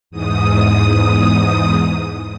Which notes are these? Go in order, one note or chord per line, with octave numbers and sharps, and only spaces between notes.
E2 G#2 D#6